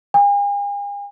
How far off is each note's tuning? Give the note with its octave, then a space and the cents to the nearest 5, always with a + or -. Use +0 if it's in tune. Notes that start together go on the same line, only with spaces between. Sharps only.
G#5 -45